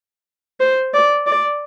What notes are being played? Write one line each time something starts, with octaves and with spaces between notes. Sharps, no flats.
C5
D5
D5